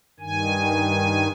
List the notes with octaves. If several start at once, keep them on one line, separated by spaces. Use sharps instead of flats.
G2 D#3 G#5